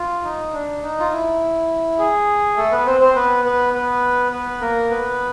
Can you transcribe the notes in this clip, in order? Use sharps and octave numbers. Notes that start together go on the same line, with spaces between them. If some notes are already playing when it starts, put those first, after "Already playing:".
Already playing: F4
D#4
D4
D#4
F4
E4
G#4
A3 A4
B3 B4
C4 C5
C4 C5
B3 B4
B3 B4
B3 B4
B3 B4
A#3 A#4
B3 B4